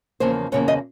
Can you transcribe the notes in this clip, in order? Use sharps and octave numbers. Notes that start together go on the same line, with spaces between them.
E2 C#3 F3 A#3 C5
E2 C#3 F3 A#3 C#5
D#5